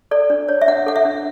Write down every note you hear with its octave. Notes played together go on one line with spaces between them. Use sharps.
A4 D5
D4
C#5
E5
D4 F#5
A4 F#5
E5
D4